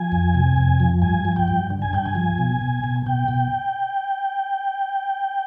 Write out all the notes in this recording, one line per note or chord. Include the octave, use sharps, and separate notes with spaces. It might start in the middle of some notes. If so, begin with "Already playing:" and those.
Already playing: F3 G#5
F2
C3
F2
F3
G2 G#5
F3
G5
G2
D3
G#5
G2 G5
G#5
F3
B2
B2
B2
B2 G5
B2